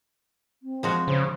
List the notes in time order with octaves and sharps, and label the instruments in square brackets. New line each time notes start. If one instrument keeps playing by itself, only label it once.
[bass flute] C4
[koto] F3 G#3 F#4
[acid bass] C#3 [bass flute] C5